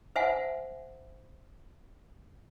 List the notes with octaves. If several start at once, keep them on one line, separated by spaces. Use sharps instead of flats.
C5 E5 F#5 G#5